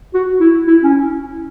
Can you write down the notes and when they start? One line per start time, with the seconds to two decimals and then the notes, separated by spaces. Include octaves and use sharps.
0.14 F#4
0.40 E4
0.67 E4
0.83 C#4